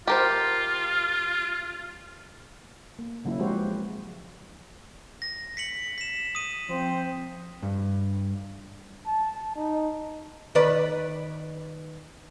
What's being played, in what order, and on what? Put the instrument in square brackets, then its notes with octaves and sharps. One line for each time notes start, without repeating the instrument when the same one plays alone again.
[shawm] F4 [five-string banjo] G4 A#4 C5
[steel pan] A#3
C#3 F#3 A#3 E4
F3 G#3 C4 F#4 G4 C5
B4
[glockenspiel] A#6
B6 C#7 F#7
B6 E7
D#6 D#7
[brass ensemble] F3 C4 C5
[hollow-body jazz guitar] G2
[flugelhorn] A5
D#4
[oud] D#3 B4 D5